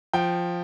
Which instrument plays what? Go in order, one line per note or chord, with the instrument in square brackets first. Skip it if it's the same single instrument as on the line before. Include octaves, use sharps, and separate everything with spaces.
[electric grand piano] F3 [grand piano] G5